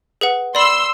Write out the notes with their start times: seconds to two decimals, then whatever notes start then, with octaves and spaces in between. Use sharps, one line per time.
0.21 G#4 B4 F#5
0.55 D5 B5 C6 E6